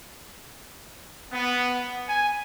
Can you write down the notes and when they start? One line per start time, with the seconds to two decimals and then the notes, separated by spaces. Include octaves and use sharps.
1.32 B3
2.08 G#5